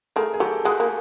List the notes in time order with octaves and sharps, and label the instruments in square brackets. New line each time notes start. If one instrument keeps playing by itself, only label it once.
[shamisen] A3 [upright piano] G#4 A#4
[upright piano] G#4
[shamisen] F#3 [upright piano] G4 A4
[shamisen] G#3 [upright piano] F#4 G#4
[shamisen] A#3